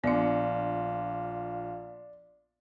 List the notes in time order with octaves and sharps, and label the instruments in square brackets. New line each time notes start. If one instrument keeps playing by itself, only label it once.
[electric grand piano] A#1 [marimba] B3 D4 [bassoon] F4 [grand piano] D5